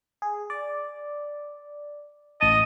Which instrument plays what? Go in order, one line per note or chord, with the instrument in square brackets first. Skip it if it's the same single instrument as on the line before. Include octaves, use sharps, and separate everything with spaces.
[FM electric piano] G#4
D5
[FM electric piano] A1 A5 [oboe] D#5 [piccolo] D#7